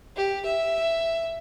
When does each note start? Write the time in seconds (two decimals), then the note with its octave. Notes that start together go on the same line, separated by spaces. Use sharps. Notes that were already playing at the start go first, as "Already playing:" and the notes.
0.16 G4
0.46 E5